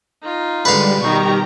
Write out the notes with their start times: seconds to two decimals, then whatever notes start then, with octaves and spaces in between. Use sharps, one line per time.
0.22 D#4 F4
0.65 D3 G3 G#3 B4 F5
1.01 B2 D#3 D#4 G4 A#5 C#6